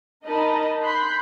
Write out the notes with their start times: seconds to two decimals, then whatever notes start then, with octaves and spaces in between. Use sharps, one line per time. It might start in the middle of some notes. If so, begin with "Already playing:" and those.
0.25 D#4 A#4 D#5 A5 B5
0.83 B5 C6 F#6 G6 B6